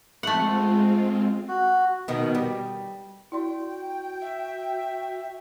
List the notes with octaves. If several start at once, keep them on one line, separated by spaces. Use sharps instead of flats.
G#3 A3 C4 F4 F#5
F#4
B2 D#3
G3
E4 F#4 D5 G5 C6
E5